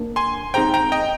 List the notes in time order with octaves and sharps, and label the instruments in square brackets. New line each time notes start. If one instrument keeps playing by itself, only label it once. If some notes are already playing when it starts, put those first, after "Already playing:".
Already playing: [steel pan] A#3 D4
[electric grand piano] G#5 C6
[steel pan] C4 D#4 G#4 C5 [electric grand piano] G5 A#5
[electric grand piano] G5 A#5
D#5 G5